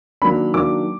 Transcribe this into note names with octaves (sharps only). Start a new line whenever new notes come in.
D#3 F#3 A#3 D4 B5
D#3 F#3 A#3 D4 D6